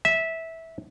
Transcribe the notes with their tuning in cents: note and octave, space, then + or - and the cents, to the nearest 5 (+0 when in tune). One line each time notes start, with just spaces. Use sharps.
E5 -15